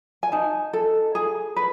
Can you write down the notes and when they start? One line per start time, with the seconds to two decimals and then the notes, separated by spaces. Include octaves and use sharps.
0.23 G#5
0.32 D#4 A5
0.73 A4
1.15 G#4 G#5
1.56 B4